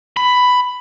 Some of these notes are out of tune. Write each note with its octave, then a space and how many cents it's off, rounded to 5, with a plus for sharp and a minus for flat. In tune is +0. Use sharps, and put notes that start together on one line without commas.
B5 +10